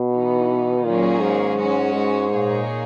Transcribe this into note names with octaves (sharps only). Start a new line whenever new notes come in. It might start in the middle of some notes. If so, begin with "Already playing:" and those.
Already playing: B2
E3 B3 D#4
A#2 D#3 F#3 A#3 C#4 G#4
G#2
G#3 C#4 F#4
G#2
A#2 A#3 D#4 G#4 C#5